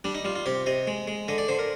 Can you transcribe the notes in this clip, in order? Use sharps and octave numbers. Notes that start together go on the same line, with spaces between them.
G3 D4
D#4
G3 F4
F4
C3 G4
C3 D#5
G#3
G#3
D3 D#5
D5
D3 C5
A#4